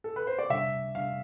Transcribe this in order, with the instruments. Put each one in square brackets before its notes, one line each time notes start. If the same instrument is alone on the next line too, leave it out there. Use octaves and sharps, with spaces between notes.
[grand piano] A4
B4
C5
D5
[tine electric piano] C3 G3 D4 [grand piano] E5
[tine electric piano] C3 G3 D4 [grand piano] F5